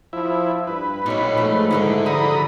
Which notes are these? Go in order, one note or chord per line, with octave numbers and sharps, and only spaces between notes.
F3 E4
G2 B4
B1 A#2 F#3 D#4 C#5
G#2 F3 A3
D3 G#3 E4 A4 A#4
F3 G3 A#5 B5 D#6